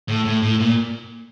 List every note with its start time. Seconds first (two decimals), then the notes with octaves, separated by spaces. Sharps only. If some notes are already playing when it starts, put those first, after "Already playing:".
0.09 A2
0.26 A2
0.43 A2
0.61 A#2